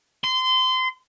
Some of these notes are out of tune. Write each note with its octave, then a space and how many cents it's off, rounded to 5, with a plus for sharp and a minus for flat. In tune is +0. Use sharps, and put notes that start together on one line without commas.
C6 -25